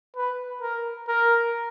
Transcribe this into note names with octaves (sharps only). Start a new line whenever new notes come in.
B4
A#4
A#4